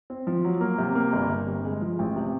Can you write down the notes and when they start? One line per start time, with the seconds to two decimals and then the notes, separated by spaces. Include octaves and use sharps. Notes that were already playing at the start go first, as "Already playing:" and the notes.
0.10 C4
0.27 F3
0.45 F#3
0.61 A#3
0.78 C3
0.95 A#3
1.13 G1
1.29 G1
1.47 C3
1.64 G#3
1.81 F3
1.99 A1
2.16 C3